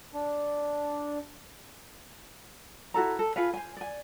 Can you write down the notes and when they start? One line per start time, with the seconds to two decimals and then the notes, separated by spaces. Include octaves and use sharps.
0.14 D4
2.94 E4 F#4 A4 A#5
3.19 A4
3.36 F4 G#4 B4 F5
3.53 C5 G#5
3.77 D5 G#5